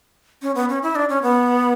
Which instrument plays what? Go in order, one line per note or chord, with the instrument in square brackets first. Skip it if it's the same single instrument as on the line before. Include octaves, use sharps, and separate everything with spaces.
[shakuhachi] C#4
B3
C#4
E4
D4
C#4
B3